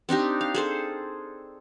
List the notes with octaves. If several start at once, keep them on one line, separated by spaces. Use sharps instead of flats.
C4 D4 D#4 G4
F5
G#4 A4 C5